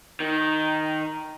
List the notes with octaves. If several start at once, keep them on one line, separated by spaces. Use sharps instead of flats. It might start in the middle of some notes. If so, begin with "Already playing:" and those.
D#3